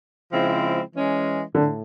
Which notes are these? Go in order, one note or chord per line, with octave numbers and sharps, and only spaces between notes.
C#3 F3 G#3 C4 E4
E3 G#3 C#4
A2 D3